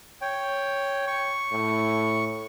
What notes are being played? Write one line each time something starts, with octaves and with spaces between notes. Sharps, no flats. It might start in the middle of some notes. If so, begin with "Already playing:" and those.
C#5 G5
C#6
A2